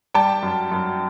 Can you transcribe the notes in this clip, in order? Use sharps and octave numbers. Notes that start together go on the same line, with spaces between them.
G3 G5 A5
F#2
F#2